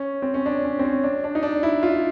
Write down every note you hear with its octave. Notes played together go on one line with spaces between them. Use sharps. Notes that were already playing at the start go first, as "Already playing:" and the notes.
Already playing: C#4
C4
C#4
D4
C#4
C4
C#4
D4
D4
D#4
D4
E4
F4